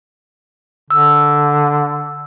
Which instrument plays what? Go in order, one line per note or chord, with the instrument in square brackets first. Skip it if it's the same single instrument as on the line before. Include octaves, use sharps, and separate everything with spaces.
[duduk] D3 [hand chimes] E6